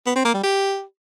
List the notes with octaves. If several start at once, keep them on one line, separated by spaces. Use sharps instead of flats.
B3
C4
A#3
G3
G4